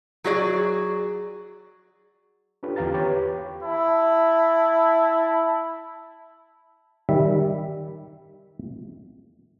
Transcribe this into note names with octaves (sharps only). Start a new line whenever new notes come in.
F#3 F#4 G#4 D5
C#4 D4 F4 G4 A4 B4
E2 D3 G4 F5 A#5 A6
G4 B4 C#5
E4 A5
D#3 G3 E5